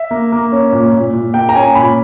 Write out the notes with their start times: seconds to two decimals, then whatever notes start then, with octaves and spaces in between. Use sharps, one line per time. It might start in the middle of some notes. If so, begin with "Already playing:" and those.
Already playing: E5
0.11 A#3
0.32 A#3
0.52 C#4
0.73 A#2
0.93 A#2
1.13 A#2
1.34 A#3 G5
1.49 A#5
1.55 C#4 G#5
1.75 A#2 B5